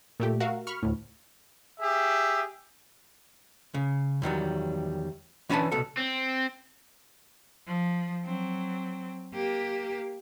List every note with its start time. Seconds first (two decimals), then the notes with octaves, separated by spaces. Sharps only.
0.20 A#2 A3 G4
0.40 F#4 A#4 E5 F5
0.67 B5 C#6 F6
0.83 D2 A2
1.80 G4 G#4 E5
3.74 C#3
4.22 E2 D#3 F#3 G3
5.49 E3 C#4 D4 B4 G#5 A5
5.72 C2 B2 A4
5.97 C4
7.67 F3
8.25 F#3 C4
9.33 A#3 G4